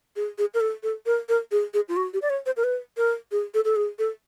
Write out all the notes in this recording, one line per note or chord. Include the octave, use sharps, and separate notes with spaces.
G#4
G#4
A#4
A4
A4
A#4
A#4
G#4
G#4
F4
F#4
G4
D5
C#5
C5
A#4
B4
A#4
G#4
A4
A4
G#4
A4